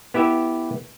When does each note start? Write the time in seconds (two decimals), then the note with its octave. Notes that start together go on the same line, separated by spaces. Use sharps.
0.14 B3 E4 G4 E5